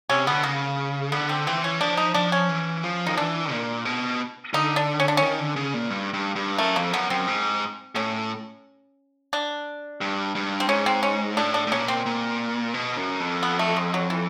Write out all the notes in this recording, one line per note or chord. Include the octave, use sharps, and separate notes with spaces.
C3 C#4
D3 B3
C#3 A#3
D3 B3
C4
E3 C4
C#4
F3 D4
D#4
F3 D4
C#4
E3
F3
D#3 D#4
E3 D4
A#2
B2
D3 D#4
D4
C#4
D4
C#4
D#3
D3
C#3
A#2
G2
G2
G2
F#2 A3
F2 A#3
F#2 B3
F#2 C4
G#2
A2 C#4
D4
G2
G2
C4
G#2 C#4
C4
C#4
A2 D4
D4
A2
A#2 C#4
C4
A#2
B2
F#2
F2
B3
A3
G#3
F#3
E3